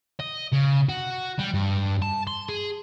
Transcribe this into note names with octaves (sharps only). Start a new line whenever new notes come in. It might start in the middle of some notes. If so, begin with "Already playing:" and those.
D#5
C#3
F#4
G3
G2
A5
C6
G#4